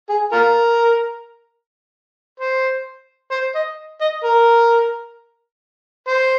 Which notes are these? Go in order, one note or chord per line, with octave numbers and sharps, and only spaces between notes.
G#4
F4 A#4
C5
C5
D#5
D#5
A#4
C5